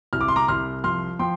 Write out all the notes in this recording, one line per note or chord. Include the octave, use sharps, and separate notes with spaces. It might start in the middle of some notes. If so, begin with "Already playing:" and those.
C2 F6
D6
C6
A#5 D6
C2 C6 F6
F3 C6 F6
F3 G5 C6